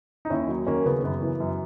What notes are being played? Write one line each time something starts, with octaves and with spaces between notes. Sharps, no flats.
D#4
D#2 C#4 E4
F#3
D#2 A#3 C#4
C#3 B3
F#2 B3
E3
F#2